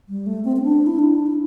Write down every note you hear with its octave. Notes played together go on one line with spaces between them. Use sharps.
G3
A3
C4
C4
D4
E4
D4
E4